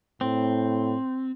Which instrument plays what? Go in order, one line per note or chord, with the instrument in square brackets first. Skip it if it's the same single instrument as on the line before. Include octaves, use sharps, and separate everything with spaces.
[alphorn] A2 [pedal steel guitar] C4